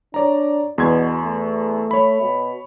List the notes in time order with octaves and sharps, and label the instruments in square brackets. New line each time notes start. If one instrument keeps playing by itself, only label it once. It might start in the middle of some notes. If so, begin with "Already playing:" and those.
[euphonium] D4 [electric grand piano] C#5 D5 A#5
[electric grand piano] E2 C6 G#6 [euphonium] B2
[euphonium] A3
[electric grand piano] C#5 B5
[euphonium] B2